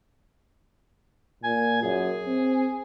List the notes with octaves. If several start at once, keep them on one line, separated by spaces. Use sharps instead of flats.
A#2 G#5
F#2 G#4
C4